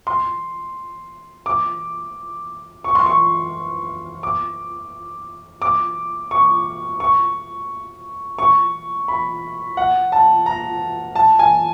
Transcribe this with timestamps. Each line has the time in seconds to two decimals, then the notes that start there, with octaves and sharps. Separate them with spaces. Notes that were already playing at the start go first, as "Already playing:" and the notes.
0.07 C6
1.46 D6
2.84 C#6
2.95 C6
3.06 C#6
4.23 D6
5.62 D6
6.31 C#6
7.00 C#6
8.39 C#6
9.08 B5
9.77 F#5
10.12 A5
10.46 A#5
11.15 A5
11.39 G#5